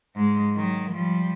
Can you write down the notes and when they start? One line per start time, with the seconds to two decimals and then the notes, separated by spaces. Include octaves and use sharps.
0.16 G#2 G#3
0.56 D#3 F#3
0.92 F3 G3